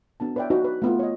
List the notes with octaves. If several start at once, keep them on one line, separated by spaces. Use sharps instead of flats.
B3 D4 A5
B4 C#5 D5 E5 G5
D#4 F#4 B4 D#5
B4
A3 B3 F4
C#5 D#5